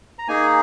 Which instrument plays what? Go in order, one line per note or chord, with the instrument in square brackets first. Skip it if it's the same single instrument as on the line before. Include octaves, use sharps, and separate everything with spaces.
[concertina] A#5
A#3 D#4 G#4 G#5